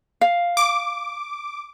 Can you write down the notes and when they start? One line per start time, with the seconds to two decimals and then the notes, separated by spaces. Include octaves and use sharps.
0.21 F5
0.57 D6